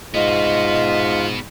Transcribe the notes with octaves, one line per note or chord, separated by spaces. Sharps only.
G#2 B3 F4 F#4 D#5